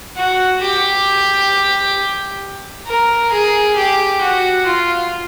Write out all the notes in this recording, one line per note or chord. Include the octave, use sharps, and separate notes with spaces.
F#4
G4
A#4
G#4
G4
F#4
F4